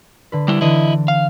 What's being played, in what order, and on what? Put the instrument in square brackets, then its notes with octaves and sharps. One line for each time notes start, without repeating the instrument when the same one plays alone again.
[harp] D3 B4
[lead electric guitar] G3 E4 [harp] D7
[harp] D3 E3 [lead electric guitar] E4 D#5
[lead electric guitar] F5